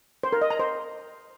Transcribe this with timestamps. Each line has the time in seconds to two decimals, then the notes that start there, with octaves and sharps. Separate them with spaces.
0.23 C5
0.33 A#4
0.42 D#5
0.51 A#5
0.60 C5